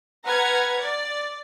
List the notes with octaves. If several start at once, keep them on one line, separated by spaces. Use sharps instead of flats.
B4 F#5 A#5 F6 G#6
D5